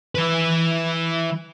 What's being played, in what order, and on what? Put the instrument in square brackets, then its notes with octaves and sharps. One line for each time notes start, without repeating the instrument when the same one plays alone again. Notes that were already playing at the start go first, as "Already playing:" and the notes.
[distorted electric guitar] E3 B4